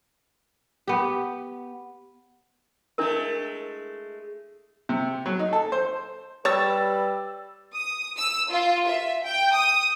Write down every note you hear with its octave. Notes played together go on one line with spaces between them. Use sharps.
B3 G4
G#3 A3 D4 E4 A#4
C3
F#3
D#4
A4
C5
G3 B4 C#5 E6 A6 E7
D#6
E6
F4
E5
G5
D#6